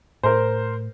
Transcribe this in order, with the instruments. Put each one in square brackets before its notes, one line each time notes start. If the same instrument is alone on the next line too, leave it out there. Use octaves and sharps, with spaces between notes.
[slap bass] A2 [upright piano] A#4 C5